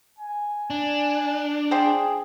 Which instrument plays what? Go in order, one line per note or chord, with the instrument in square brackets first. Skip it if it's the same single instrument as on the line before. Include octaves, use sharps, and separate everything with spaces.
[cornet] G#5
[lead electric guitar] D4
[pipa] F3 C5 G5 [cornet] G#4